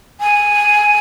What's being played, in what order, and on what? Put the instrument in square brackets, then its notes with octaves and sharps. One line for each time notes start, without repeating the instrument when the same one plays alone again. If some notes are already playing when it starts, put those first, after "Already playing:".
[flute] G#5